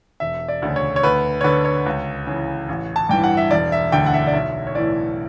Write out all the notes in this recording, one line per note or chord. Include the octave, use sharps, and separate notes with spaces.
E1 E5
D5
D2 C#3
C#5
C#5
D2 B4
C#5
D3 B4
C#5
C#2
C#3 E3
A1
A5
G2 E3 G5
F#5
E5
E1 D5
E5
D2 D3 G5
F#5
E5
D5
B1 E5
C#5
A2 E3 D5